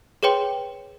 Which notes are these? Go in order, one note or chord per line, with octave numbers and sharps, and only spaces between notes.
G#4 B4 C#5 G5 C6